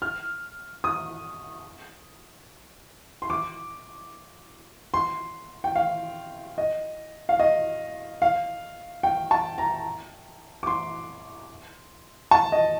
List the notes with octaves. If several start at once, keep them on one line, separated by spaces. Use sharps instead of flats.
F6
D#6
C6
D6
C6
G5
F5
D#5
F5
D#5
F5
G5
A5
A#5
D6
C6
A5
D#5